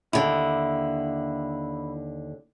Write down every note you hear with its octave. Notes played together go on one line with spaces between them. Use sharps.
D#2 D3 E4